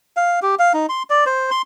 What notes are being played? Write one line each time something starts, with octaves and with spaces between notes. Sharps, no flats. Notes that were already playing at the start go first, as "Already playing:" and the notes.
F5
G4
F5
D#4
C6
D5
C5
C6